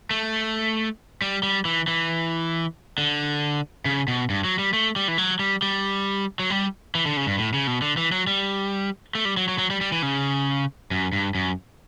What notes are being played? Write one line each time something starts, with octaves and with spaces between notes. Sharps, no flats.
A3
G3
G3
E3
E3
D3
C#3
B2
G2
F#3
G3
A3
G3
E3
F#3
G3
G3
F#3
G3
E3
D3
C#3
G2
A2
C#3
B2
D3
E3
F#3
G3
A3
G3
F#3
F#3
F#3
G3
G3
E3
C#3
F#2
G2
F#2